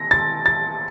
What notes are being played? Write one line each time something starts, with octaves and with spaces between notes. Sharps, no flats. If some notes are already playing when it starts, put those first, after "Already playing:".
Already playing: A#6
A6
A6